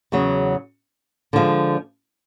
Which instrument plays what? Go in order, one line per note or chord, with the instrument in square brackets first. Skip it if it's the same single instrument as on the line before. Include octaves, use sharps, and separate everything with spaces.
[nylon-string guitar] E2 C#3 F#3
D3 F3 G#3